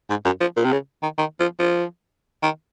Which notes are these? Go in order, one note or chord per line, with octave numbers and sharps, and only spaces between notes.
G#2
F#2
F3
A#2
C3
C#3
D#3
D#3
F3
F3
D#3